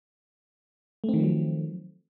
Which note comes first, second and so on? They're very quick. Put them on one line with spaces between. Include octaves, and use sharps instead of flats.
A3 C4 D#3 F3 F#3